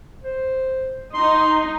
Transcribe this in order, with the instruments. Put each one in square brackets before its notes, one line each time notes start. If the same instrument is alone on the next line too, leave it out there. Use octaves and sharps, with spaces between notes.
[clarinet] C5
[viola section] D#4 [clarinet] C6